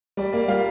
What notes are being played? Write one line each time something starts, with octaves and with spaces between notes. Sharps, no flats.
G3 D5
A#3 D5
G3 F4 F5